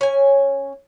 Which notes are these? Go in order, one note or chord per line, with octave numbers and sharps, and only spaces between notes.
C#4 G#5